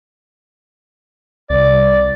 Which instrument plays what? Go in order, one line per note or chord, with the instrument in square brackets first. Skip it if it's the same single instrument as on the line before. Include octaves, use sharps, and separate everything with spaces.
[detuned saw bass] C2 [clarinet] D5